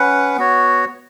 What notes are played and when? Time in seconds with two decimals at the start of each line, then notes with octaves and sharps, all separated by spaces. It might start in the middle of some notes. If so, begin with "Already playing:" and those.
Already playing: C#4 B4 F#5
0.36 B3 F#4 C#5